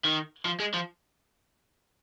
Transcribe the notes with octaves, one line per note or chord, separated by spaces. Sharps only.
D#3
F3
G#3
F3